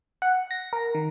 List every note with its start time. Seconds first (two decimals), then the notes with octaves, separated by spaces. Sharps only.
0.22 F#5
0.51 A#6
0.73 A#4
0.95 D#3